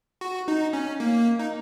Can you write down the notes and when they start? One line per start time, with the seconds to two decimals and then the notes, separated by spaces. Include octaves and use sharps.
0.21 F#4
0.48 D#4
0.73 C#4
1.00 A#3
1.39 D#4